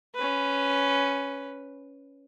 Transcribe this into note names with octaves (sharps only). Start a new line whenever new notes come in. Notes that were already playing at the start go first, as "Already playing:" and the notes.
C#4 B4